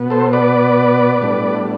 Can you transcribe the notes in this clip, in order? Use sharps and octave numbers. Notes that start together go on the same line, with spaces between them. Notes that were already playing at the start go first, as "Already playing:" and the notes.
Already playing: B2 B3
A4 C5
B4 D5
A2 G3 B3 D4